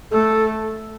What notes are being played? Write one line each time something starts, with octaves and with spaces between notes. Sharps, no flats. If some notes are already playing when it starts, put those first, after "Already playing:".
A3 A4